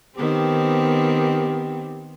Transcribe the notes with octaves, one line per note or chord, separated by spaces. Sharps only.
D#3 B3 C4 G4